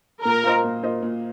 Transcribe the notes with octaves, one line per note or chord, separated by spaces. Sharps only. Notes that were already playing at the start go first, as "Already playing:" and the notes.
A#2 A#4
A#3 F4 C5 D#5
A#2
A#3 F4 C5 D#5
A#2